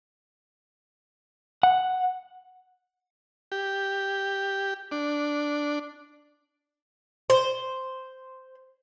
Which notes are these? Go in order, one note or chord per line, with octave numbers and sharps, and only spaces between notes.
F#5
G4
D4
C5